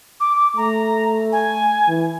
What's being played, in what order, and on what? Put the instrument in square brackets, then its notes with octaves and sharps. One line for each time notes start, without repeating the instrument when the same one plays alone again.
[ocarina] D6
[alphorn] A3 [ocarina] A#5
[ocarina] G#5
[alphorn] E3